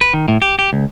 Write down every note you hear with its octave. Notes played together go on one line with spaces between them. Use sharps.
B4
D#3
A2
G4
G4
C#2